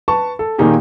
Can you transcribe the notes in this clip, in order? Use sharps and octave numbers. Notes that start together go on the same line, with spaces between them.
B4 A5 C#6
A4
A#2 D#3 A#3 D#4 G4 G#4